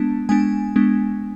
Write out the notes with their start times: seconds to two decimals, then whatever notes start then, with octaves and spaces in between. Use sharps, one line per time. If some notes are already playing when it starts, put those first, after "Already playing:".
Already playing: G#3 B3 D4 A5
0.29 G#3 B3 D4 G#5
0.76 G#3 B3 D4